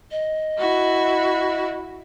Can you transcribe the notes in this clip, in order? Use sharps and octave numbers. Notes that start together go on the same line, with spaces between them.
D#5
E4 F#4